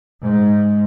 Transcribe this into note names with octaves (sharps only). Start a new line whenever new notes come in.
G#2